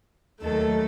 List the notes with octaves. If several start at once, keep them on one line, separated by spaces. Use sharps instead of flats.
D#2 D#3 F#3 A3 A#3 A4